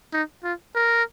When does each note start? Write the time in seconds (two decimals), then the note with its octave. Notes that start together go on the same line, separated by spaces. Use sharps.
0.13 D#4
0.44 F4
0.75 A#4